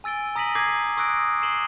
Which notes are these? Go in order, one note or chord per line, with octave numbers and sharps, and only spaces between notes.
G#5 E6 A6 D7 G7
A#5 D#6 A#6 B6 D#7 F#7
D6 G6 G#6 B6 C7
C#6 D#6 E6 F#6 A#6 D7
C7 D#7 E7 F#7 G7